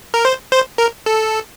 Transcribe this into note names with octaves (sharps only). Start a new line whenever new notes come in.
A#4
C5
C5
A#4
A4